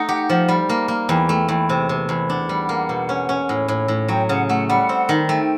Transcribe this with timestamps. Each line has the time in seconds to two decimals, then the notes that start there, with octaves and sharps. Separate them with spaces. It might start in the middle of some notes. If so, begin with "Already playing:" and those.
Already playing: A3 D#4 F#5
0.09 G4
0.30 F3
0.48 G3
0.69 A#3
0.88 A#3
1.08 E2 G5
1.29 A3
1.49 E2
1.69 C3
1.89 C3
2.09 E2
2.29 D4 F#5
2.49 G3
2.69 A#3
2.89 B2
3.09 C#4
3.29 C#4
3.49 A2
3.68 A2
3.88 A2
4.08 F#3 G5
4.29 C#3 F#5
4.49 A3 F#5
4.69 G3 F#5
4.89 C4
5.09 D#3
5.29 A3 G5